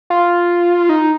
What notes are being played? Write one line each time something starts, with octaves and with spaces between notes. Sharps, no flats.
F4
D#4